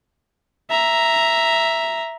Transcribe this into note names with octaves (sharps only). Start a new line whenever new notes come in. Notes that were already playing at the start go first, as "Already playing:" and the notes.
E5 A#5